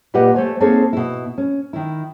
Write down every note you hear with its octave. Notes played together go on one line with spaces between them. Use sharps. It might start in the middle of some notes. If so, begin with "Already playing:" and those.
A#2 G3 G4 B4 D#5 F#5
A3 C5 C#5 G#5
A#3 C4 D#4 G#4 A4 C#5
B2 E4
C#4
D#3 E4